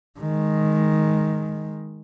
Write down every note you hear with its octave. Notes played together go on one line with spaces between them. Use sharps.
D#3 G#3